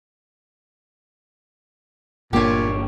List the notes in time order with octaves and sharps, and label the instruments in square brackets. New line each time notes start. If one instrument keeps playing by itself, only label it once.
[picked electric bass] G1 A#3 D4 [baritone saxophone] A#2 [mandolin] G4 C#5